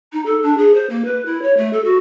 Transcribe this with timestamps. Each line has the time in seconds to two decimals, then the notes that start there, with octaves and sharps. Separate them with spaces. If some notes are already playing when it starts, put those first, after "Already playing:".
0.12 D#4
0.25 A4
0.42 D4
0.57 G#4
0.74 C5
0.89 A#3
1.05 B4
1.25 E4
1.42 C#5
1.57 A3
1.73 A4
1.84 F#4